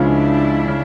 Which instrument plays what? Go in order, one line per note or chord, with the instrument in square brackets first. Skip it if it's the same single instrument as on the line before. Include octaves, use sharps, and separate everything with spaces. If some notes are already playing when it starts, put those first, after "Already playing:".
Already playing: [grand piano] C#2 C#3 F3 G#3 [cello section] D4 E4
[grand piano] C#3